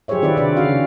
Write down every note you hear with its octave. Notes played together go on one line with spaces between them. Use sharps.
F#3 G4 G#4 C5 C#5 E5
D#3 C4 F4 B4 D5 E5
C3 D4 B4 D5
C#3 C#4 F#4 F5